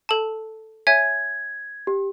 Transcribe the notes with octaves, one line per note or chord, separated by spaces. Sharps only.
A4 A5
C#5 E5 G#5 G#6
G4